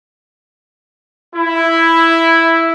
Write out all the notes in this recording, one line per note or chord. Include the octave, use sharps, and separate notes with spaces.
E4